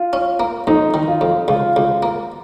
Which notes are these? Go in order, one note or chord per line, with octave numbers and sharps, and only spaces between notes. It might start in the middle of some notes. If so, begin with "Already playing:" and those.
Already playing: F4
C#4
A#3
F2 D#4
D#3
F4
F2
C#2 F4
C#2
A#3